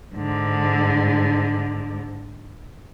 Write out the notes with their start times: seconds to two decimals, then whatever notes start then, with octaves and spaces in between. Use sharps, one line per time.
0.15 G#2 D3